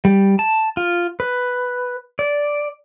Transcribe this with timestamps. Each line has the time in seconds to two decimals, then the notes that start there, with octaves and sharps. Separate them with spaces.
0.05 G3
0.39 A5
0.77 F4
1.20 B4
2.19 D5